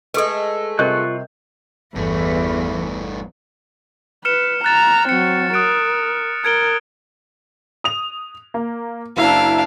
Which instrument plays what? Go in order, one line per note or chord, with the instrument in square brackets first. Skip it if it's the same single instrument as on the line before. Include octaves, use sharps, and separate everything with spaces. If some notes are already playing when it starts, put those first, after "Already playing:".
[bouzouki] G#3 A3 [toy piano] A4 B4
[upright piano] C3 G3 G6 [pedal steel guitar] F4 C#6 F#6 [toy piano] A#4 D#5
[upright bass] G1 [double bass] E2 [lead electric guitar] G2 A3 [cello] E3
[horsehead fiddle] B4 [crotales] F6 C#7 E7
[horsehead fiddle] A#5 [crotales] F#6 A6 E7
[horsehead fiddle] F#3 C4 [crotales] C#7
[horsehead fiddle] A#4 [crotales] D#6 F#6 D7
[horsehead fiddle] A#4 [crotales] G#6 D7 G7
[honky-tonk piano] D#6 F7
A#3
[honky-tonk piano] F#1 E4 A#5 [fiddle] D4 F5